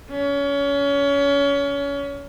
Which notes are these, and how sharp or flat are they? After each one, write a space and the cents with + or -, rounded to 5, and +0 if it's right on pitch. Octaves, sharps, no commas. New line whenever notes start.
C#4 +25